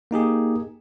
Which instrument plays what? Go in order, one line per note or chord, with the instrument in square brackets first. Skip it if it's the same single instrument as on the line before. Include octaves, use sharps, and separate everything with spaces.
[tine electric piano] A#3 D#4 G4 G#4